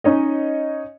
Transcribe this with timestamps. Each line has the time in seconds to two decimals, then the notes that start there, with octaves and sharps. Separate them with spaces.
0.04 C#4 D#4 C#5 D#5